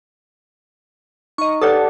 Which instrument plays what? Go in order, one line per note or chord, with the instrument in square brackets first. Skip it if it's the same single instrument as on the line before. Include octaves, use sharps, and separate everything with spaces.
[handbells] D#4 [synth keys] D#5 C#6
[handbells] G4 D5 F#5 [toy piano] A4 B4 C#5 [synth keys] A5